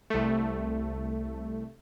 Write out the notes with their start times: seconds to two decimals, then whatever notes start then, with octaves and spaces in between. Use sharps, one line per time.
0.10 C2 A3